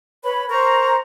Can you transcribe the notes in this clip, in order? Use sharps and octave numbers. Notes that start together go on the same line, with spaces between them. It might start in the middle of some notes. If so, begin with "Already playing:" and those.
B4 C#5 B5
A#4 C5 A#5 C#6